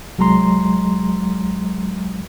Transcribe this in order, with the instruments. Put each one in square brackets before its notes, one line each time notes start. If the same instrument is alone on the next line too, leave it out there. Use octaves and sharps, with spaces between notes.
[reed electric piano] C2 F#3 G#3 A#5 C6